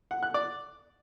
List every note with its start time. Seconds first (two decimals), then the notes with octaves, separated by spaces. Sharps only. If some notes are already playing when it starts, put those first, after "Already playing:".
0.11 F#5
0.23 F#6
0.34 D5